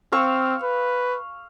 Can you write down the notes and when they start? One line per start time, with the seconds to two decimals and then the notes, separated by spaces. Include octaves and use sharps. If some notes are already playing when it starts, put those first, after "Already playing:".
0.12 C4 F5 C#6 E6
0.63 B4